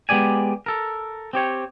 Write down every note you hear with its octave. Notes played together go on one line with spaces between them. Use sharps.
G#3 B3 G4 D5 G#5
A4 A#4
C4 G4 C#5